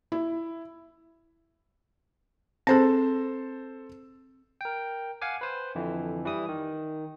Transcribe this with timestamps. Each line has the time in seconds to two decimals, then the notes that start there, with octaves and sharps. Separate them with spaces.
0.12 E4
2.67 C4 G#4 A4 C5 A5
4.61 A#4 G5
5.21 F5 F#5 G#5 D6
5.41 B4 C5
5.75 F2 D3 E3
6.26 E3 G3 D#6
6.49 D#3